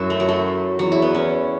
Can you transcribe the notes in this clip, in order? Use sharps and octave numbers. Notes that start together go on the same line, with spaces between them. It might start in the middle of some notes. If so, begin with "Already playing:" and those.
Already playing: F#2 E4 F#4
A3
F#3
A3
E2 F#3
E4
B3
C#4